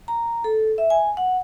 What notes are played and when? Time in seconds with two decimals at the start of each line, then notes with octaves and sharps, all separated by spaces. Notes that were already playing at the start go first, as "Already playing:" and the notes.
0.08 A#5
0.44 A4
0.78 E5
0.90 G#5
1.17 F#5